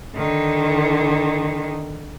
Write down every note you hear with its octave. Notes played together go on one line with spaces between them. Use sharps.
D3 D#3